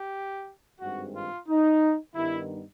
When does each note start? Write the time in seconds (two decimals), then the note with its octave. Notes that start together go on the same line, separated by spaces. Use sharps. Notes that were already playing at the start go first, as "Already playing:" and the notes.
Already playing: G4
0.80 G#1 G2 D#3 G#3 C4 F#4
1.14 F4
1.48 D#4
2.15 G2 D#3 G3 B3 D#4 E4